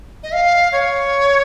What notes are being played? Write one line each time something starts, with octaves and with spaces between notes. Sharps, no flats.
D#5
F5
C#5